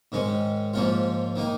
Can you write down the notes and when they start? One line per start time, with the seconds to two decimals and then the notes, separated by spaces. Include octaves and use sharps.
0.12 G#2 D#3 G#3 C#4
0.74 G#2 F3 A#3 C#4 F4
1.36 D#3 A#3 D#4